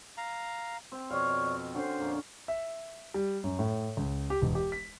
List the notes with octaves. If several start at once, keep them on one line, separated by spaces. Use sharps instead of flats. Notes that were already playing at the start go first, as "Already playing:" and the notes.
F5 A#5
C4
F2 B2 C#5 D5 F5 C#6
D3 C#4 D4 F#4 C5
F2 A#2 A#3
E5
G3
F#2
A2
C#2
G4
E1
G4
B6